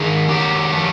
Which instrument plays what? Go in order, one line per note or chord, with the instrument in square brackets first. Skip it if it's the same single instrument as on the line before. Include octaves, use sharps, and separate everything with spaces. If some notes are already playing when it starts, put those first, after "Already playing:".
Already playing: [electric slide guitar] D#3 D4 G#4
F#3 G4
A3